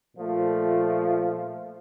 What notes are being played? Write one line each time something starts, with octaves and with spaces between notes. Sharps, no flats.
A#2 F3 A3